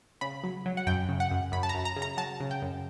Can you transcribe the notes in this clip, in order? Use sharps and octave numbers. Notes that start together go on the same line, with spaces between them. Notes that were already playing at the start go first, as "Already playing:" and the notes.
C#3 B5
F#3
F#3
F#5
F#2 G5
C#3
F#5
F#2
F#2 B5
A5
A#5
F#2
A#5
C#3
A#5
F#3 A5
C#3
G5
F#2